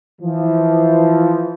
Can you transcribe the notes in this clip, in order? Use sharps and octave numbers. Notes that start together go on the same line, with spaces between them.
E3 F3